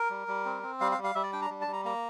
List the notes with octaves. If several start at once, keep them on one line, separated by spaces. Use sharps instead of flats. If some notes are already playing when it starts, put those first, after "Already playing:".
Already playing: A#4
G3
G3
C4
C4
G3 F5
F5
G3
F5
G3 E5
D5
D4 G5
A#5
G3
A5
G3
A#5
A#3 A#5